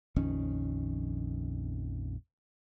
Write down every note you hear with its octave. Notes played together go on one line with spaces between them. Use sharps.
A#1 F2 D#3 C#4